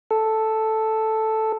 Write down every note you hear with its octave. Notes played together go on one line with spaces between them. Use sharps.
A4